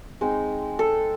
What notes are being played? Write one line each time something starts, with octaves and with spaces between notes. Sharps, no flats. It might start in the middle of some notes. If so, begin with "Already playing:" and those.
G#3 C4 D#4
A4